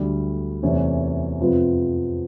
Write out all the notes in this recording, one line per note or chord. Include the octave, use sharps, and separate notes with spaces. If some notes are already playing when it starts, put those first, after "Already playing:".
Already playing: D2 D3 G3
E2 C3 E3 A3 C#4
F2 C3 F3 G#3 B3